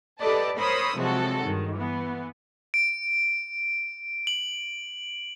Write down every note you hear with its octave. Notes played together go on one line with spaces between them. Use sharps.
G4 A4 B4 D5 D#5 A5
A#4 C5 C#5 B5 D#6 E6
C3 F3 F#3 G#3 F#4 A4
G2 D#3
E3 B3
D7
F#7